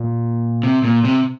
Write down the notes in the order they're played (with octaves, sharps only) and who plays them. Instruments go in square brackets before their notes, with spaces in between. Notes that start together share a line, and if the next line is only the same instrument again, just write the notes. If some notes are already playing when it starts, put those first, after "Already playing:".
Already playing: [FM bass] A#2
[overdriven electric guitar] C3
A#2
C3